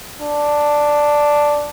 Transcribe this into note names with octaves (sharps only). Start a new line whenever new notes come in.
D4